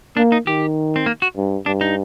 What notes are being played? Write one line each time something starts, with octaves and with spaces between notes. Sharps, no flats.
A#3 D4
D#4
D#3 G4
C4
A#3
F#4
G2
G2 D4
D#4